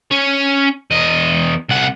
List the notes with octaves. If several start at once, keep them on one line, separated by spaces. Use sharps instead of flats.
C#4 C#5
E2 D#5
C2 F#5